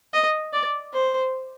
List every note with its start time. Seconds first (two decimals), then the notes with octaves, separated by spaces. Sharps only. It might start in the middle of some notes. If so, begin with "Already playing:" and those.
0.13 D#5
0.53 D5
0.93 C5